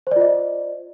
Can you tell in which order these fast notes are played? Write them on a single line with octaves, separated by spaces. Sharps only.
C5 D5 F4 D#5